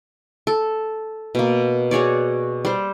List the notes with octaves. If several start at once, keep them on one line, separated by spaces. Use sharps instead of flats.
A4
B2 A#3
F#4 G#4 C#5 D5
G3 C5